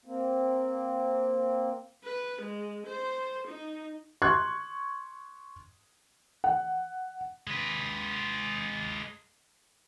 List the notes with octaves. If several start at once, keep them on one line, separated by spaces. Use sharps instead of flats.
A#3 C4
B4
G#3
C5
D#4
C6 C#6 F#6 G#6
F#5
G#3 B4